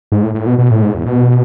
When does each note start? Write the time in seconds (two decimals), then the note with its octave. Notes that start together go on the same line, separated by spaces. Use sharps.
0.12 G#2
0.23 A2
0.35 A2
0.47 B2
0.59 B2
0.71 A2
0.82 G#2
0.94 E2
1.06 B2